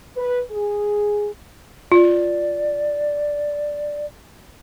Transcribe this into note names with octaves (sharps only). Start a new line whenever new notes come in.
B4
G#4
F4 D5